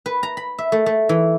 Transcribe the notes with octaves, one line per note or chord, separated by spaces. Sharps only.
B4
A#5
B5
E5
A3
A3
E3